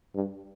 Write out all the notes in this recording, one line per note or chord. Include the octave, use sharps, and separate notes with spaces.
G2